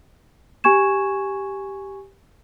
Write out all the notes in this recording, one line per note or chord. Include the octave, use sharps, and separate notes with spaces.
G4 G#5 C#6 G#6 E7